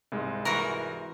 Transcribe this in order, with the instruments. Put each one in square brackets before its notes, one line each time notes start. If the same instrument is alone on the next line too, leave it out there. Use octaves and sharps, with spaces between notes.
[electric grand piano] C2 G#2 G#3
[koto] E3 F#4 A#4